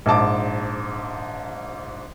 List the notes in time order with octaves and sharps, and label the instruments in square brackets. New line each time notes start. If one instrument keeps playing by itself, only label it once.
[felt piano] A#1 G#2 A5 D6